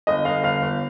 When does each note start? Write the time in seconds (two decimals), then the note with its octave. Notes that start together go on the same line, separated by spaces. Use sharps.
0.07 G1 D#5
0.25 G1 F5
0.43 G1 F5
0.62 G1